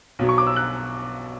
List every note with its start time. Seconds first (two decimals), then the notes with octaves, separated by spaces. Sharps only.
0.19 B1 B2 F#3
0.29 C#6
0.38 D6
0.47 E6
0.56 F#6